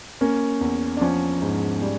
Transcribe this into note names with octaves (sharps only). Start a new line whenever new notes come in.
A#3 C#4
E2
D4
F3 C#4
G#2
G3